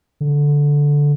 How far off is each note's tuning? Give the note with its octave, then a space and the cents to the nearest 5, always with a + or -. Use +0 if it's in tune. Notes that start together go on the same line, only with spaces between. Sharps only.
D3 -10